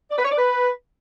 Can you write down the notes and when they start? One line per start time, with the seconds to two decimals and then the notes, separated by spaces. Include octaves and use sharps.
0.11 D5
0.17 B4
0.24 C#5
0.31 D5
0.38 B4